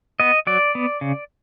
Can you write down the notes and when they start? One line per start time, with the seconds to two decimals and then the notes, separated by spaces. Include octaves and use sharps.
0.20 B3 D#5
0.47 F#3 D5
0.75 B3
1.01 C#3